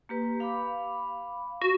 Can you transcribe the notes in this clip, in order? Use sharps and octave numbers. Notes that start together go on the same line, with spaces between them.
A#3 G4 B4
F5 B5 D6
F#4